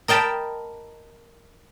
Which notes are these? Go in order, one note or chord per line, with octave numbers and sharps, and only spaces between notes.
A#4 D#5 G5 A5 B5